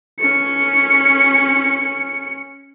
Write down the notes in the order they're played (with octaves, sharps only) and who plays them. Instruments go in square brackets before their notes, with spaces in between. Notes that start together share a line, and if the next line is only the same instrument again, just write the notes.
[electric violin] C#4 C#7